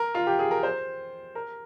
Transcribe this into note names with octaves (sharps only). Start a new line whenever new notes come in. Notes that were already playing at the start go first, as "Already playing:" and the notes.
Already playing: A#4
F4
G4
G#4
A#4
C5
A#4